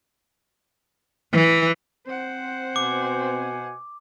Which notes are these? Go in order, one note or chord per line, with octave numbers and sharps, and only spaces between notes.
E3
C4 C5 F#5
B2 G#5 D6